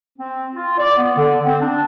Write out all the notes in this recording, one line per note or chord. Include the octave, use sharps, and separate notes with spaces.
C4
F4
D5
B3
D3
C4
D4